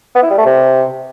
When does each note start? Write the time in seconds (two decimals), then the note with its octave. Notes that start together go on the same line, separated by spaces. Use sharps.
0.15 B3
0.23 E4
0.30 G3
0.38 A3
0.45 C3